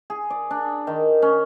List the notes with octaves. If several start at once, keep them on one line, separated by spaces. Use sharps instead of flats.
G#4
D5
D4
D#3
C#4